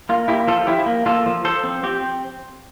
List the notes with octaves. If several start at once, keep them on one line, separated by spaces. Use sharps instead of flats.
A#3 F4
A#3 E4 G4
F3 F4 A4
F3 E4 G4
A#3
A#3 F4 A4
F3
F3 A4 C5
C4
C4 G4